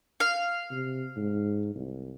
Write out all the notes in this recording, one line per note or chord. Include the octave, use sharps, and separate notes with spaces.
F5
C3
G#2
C2